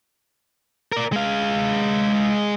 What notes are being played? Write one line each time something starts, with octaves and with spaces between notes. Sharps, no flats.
A#4 D5
G#3 F5